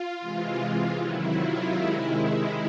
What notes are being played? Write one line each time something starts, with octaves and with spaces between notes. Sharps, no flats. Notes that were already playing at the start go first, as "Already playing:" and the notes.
Already playing: F4
C3 E3 G#3
C3 D#3 F#3 E4
F4
C3 D#3 G#3 E4